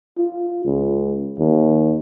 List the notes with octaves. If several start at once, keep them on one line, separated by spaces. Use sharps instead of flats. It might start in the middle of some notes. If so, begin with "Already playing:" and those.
F4
C#2
D#2